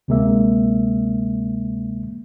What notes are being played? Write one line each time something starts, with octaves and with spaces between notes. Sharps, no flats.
D2 C3 G#3 A#3 E5